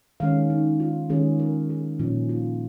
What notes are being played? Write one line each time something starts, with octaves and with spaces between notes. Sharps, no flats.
D#3 G#3 C#4 F5
D#4
F4
D#3 G#3 C#4 G#4
A#4
G#4
A#2 F3 C#4 D#4
F4